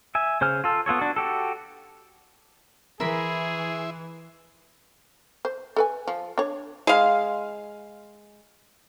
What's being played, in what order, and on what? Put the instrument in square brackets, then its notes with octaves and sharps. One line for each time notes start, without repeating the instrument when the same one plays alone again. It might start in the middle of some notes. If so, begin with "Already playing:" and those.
[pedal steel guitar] E5 G#5
C#3 C5 G#5 F6
F4 A4
B3 F4 A4 C#5
D4 F#4
F#4 G4 A4
[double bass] E3 [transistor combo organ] E4 E5 C6 [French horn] G#4 [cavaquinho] A#4 B5
[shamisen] C5
A4 B4 G#5
F3
D4 C#5
[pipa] G#3 F5